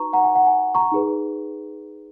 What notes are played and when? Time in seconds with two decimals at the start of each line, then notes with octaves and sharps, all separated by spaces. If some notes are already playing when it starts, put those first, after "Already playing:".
Already playing: D#4 F#4 B4 A#5 C#6
0.13 F#5 A#5
0.24 G#5
0.35 F#5
0.47 G#5
0.75 A#5 C#6
0.92 D#4 G#4 B4